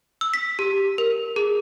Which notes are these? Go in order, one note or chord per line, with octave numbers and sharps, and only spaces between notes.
E6
B6
G4
A#4
G#4